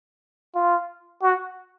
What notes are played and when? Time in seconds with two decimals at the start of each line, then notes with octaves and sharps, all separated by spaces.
0.55 F4
1.22 F#4